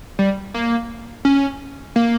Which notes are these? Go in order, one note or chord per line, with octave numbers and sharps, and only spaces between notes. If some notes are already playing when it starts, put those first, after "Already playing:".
G3
A#3
C#4
A#3